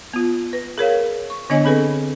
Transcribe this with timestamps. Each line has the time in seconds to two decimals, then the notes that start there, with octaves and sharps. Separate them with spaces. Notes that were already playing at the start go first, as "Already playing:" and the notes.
0.14 B3 F4
0.53 B4
0.78 G#4 A#4 C#5 F5
1.30 C#6
1.50 D3 B3 D4 C#5 D#5 G#5
1.65 C4 G#4 A4 B4